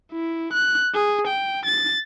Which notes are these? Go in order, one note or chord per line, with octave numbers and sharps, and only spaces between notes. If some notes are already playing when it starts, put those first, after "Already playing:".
E4
F#6
G#4
G5
A6